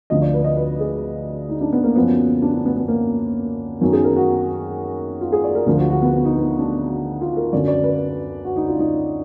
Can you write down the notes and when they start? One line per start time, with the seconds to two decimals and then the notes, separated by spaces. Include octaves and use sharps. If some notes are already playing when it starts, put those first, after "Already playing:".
0.10 D2 D3 F3 D#5
0.22 D5
0.34 B4
0.44 D#5
0.56 B4
0.80 G#4
1.49 D#4
1.61 D4
1.73 B3
1.84 A#3
1.96 F#2 F3 B3
2.42 D4
2.54 D4
2.66 B3
2.76 B3
2.88 A#3
3.81 F#2 D#3 F#3 B3
3.93 G#4
4.04 A#4
4.16 F#4
5.21 F4
5.32 G#4
5.44 D5
5.55 A#4
5.66 D2 D3 F3 A#4
5.78 F#4
5.90 F#4
6.02 B3
6.13 B3
6.25 D#4
6.37 B3
6.59 D4
7.21 F4
7.37 A#4
7.52 F#2 D3 F#3 D5
7.68 D5
7.83 B4
8.45 F#4
8.56 D#4
8.68 F4
8.79 D#4